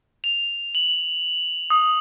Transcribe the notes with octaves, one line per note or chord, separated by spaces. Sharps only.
F7
F#7
D#6